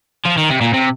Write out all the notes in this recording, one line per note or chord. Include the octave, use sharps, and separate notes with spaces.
F3
D#3
C3
A#2
C3